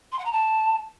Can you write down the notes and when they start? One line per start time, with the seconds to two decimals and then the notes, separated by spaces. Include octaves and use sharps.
0.12 C6
0.18 F#5
0.25 A#5
0.32 A5